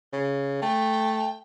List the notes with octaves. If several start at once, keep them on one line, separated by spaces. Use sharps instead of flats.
C#3
A3 G5